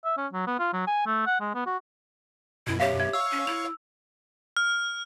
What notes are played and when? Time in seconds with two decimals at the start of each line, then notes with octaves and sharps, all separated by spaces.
0.05 E5
0.17 C#4
0.33 F#3
0.47 B3
0.59 F4
0.73 F#3
0.87 G#5
1.06 A3
1.27 F#5
1.41 G#3
1.55 B3
1.66 F#4
2.67 F#2 B2 E4
2.80 G4 C#5 E5 F5
3.00 E5 G#6
3.13 C#5 F5 C#6 E6
3.32 C#4
3.47 E4 F7
4.57 F6